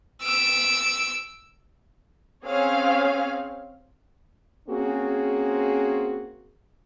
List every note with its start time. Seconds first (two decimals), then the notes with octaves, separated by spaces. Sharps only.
0.24 E6 D7
2.45 C4 C#4 G#4 C#5 F5
4.68 A#3 C4 C#4 F#4 G#4